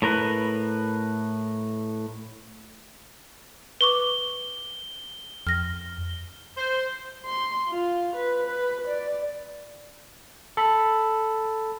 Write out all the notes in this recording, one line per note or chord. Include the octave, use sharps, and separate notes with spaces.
A2 A#4 B4
B4 C#6 D6 G7
F2 F6 A#6
C5
C6
F4
B4
B4
D5
A4 B5